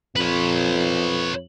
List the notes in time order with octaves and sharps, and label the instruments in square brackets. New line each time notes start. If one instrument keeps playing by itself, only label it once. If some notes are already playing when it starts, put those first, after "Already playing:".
[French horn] F2 [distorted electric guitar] B4 C#5